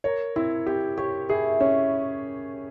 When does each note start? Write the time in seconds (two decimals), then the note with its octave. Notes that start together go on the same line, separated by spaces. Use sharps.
0.04 A#4 C#5
0.36 C4 E4
0.66 C4 G4
0.97 G4 C#5
1.29 E4 G#4
1.60 C#4 C#5